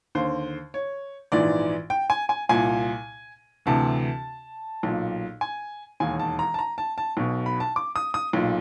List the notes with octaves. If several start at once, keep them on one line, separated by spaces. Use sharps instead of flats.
D#2 D3 C5
C#5
A#1 G#2 E3 D5
G5
G#5
G#5
C2 A#2 G#5
D2 C3 E3 A5
B1 A#2
G#5
E1 D#2 D#3 G#5
A5
A#5
A5
A#5
A5
A5
B1 B2
B5
A5
D6
D#6
D#6
B1 A#2